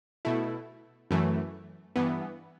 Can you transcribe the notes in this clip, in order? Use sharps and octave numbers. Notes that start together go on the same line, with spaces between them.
B2 A3 E4
F#2 E3 A3
G2 E3 B3